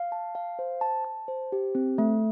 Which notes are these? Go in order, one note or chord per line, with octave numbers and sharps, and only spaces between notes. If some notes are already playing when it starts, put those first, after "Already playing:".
Already playing: F5
A5
F5
C5
A5
A5
C5
G4
C4
A3